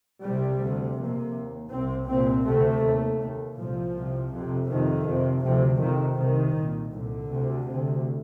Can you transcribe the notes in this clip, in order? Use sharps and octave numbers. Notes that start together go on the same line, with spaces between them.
C2 C3 G3
D2 C3
F2 C3 A#3
D#2
C2 C3 C4
C2 A#2 C4
D2 C3 A3
D#2
D#2
C2 A#2 F3
C2 C3
F2 C3
F2 C3 D#3
F2 C3
D2 C3 F3
F2 C3 D#3
C2 C3 D#3
C2 A#2
C2 A#2 D3
D2 C3
D2 C3